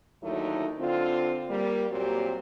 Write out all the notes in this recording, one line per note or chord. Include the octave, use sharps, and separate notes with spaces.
D#2 D3 F#3 A3 D#4 E4
D3 C4 F4
G3 A#3
A#2 F#3 C4 F#4 G4